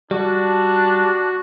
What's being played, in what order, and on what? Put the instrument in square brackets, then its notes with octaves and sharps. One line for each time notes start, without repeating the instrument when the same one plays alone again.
[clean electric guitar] G3 [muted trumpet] D4 [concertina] F#4